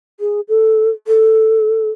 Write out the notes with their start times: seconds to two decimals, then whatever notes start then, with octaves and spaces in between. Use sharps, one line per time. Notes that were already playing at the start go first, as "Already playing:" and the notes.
0.20 G#4
0.49 A4
1.07 A4